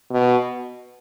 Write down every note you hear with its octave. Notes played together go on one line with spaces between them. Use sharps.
B2